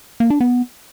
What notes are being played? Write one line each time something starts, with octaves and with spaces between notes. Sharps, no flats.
A#3
D4
B3